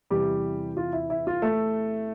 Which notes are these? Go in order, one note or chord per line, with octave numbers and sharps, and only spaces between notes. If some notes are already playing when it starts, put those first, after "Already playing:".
E2 C3 E3 G3 G4
F4
E4
E4
F4
A3 A4